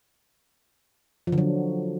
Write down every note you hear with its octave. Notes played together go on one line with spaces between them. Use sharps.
F3
D3
F#3